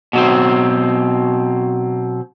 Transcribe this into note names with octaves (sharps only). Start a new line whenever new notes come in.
B2 F#3 C4